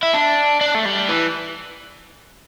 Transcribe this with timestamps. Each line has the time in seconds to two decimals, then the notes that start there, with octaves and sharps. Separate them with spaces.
0.03 E4
0.13 D4
0.61 D4
0.75 A3
0.85 G3
1.09 E3